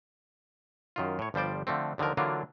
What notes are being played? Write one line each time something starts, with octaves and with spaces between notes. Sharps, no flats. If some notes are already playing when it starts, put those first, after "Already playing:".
F#2 D#3 F4
A2 C#5
G1 F3 G3 C5 D5
D3 F3 A3 C4
D#2 D3 D#3 F3 A#4
D3 E3 F#3 A#3 D4 F4